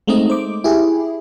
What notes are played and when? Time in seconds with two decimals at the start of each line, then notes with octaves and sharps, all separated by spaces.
0.07 G#3 A3 C4 D#4 D#5
0.30 C5 D6
0.64 E4 G4 G#4